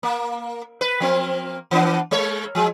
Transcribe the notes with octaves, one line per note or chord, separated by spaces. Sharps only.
A#3
B4
F3 A#3 C4
E3 B3 D4
G#3 A#3 C#5
F3 G#3